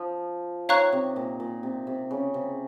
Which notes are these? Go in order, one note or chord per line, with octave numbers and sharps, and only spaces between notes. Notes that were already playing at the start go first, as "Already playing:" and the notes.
Already playing: F3
D#3 C#5 F5 A#5 C#6 F#6
C3
A#2
A#2
C3
C3
C#3
C3